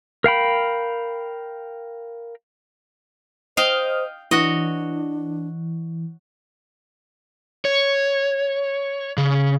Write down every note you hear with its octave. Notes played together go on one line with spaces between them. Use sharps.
A#4 F5 G5 B5
C5 D#5 F5 G5 D#6 F6
E3 D4 F#4 C#5 D#5
C#5
C#3